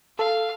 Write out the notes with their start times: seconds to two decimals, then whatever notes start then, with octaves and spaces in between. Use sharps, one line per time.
0.18 A4 F5